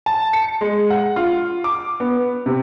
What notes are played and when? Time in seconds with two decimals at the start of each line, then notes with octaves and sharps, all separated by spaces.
0.06 A5
0.33 C#7
0.61 G#3
0.90 F#5
1.16 F4
1.64 D6
2.00 B3
2.46 C3